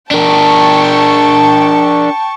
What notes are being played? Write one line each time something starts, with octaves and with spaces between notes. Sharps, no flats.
D4 A#4 G5 A5 C#6